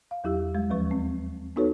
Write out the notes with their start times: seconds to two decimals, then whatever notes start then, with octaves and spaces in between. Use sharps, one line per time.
0.11 F5
0.24 E2 F#3 E4 G4 E6
0.55 G3 G#3
0.70 D#2 F3 F#3 B4 C#6
0.91 C4
1.56 B3 D#4 F#4 A4 B4 C#5